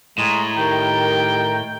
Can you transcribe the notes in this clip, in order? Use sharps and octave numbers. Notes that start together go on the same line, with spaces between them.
A2 G#3 A#5
D#3 G4 A#4 G5